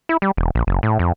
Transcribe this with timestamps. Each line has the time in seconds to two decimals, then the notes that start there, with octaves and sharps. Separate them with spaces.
0.09 E4
0.22 G3
0.37 E1
0.55 A#1
0.67 F#1
0.83 A2
0.99 F2